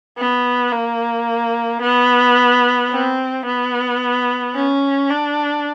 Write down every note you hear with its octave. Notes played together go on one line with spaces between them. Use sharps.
B3
A#3
B3
C4
B3
C#4
D4